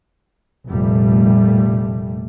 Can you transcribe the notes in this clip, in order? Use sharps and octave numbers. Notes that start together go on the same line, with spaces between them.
F1 A#2 G3 A3